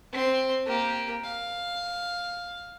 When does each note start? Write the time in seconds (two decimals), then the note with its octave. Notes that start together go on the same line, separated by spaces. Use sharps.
0.13 C4 C6
0.66 A#3 G4
1.24 F5